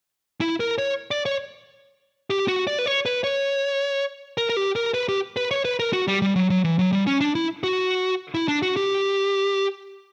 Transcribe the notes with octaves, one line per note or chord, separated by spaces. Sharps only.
E4
A#4
C#5
D5
C#5
G4
F#4
D5
B4
C#5
B4
C#5
A#4
A#4
G4
A#4
B4
G4
B4
C#5
B4
A#4
F#4
G3
G3
F#3
F#3
E3
F#3
G3
C#4
D4
E4
F#4
E4
D4
F#4
G4